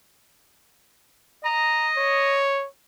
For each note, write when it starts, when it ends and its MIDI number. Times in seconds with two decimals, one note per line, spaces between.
1.45 2.42 75
1.45 1.88 82
1.97 2.67 73